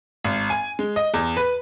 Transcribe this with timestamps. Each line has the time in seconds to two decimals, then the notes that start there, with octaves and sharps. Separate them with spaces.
0.24 G#1
0.50 G#5
0.79 G#3
0.96 D#5
1.14 E2
1.37 B4